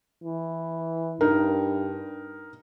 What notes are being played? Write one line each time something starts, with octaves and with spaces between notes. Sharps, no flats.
E3
G2 D#4 A#4